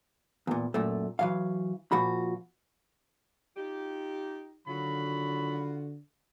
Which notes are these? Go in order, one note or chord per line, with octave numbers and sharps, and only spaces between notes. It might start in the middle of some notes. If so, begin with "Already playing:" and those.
E2 A#2
F#2 A#2 A3
E3 F#3 F5
A#2 F3 F#4 B5
D#4 F4 G4
D3 D#3 F#3 F4 F#4 B5